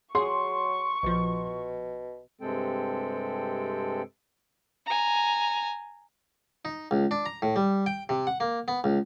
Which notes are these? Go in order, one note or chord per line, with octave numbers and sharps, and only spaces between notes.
F#3 G#4 C6 C#6
A#1 B2 F3
G2 C3 G#3 C4 A4 G5
G#5 A#5
D#4
C#2
D4
A#5
A2
G3
G5
C3
F#5
A#3
B3
C#2